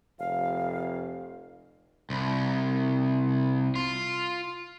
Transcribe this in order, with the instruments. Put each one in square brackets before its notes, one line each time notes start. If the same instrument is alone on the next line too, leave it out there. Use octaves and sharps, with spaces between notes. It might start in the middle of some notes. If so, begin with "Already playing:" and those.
[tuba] F1 [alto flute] F5
[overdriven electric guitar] C2
F4